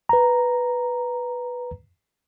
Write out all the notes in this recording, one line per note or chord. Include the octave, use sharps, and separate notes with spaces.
B4 A#5